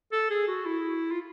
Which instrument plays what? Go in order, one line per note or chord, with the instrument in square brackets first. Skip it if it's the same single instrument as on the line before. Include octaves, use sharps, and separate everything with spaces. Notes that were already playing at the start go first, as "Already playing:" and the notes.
[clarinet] A4
G#4
F#4
E4
F4